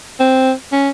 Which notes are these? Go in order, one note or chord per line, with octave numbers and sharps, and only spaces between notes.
C4
C#4